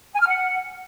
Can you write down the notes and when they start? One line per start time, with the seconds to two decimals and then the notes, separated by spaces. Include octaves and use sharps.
0.14 G#5
0.20 F6
0.27 F#5